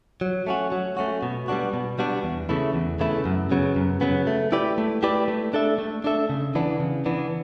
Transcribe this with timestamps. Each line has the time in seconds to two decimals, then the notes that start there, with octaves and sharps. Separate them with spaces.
0.21 F#3
0.47 A3 C#4 F#4
0.72 F#3
0.97 A3 C#4 F#4
1.23 B2
1.48 G3 B3 D4 F#4
1.74 B2
1.99 G3 B3 D4 F#4
2.24 E2
2.49 C#3 E3 A3 E4
2.75 E2
3.00 C#3 E3 A3 E4
3.26 F#2
3.51 C#3 F#3 B3
3.76 F#2
4.01 C#3 F#3 B3
4.27 A3
4.52 E4 G4 B4 D5
4.78 A3
5.03 E4 G4 B4 D5
5.28 A3
5.53 D4 A4 E5
5.78 A3
6.04 D4 A4 E5
6.30 C#3
6.55 E3 B3 D4
6.80 C#3
7.06 E3 B3 D4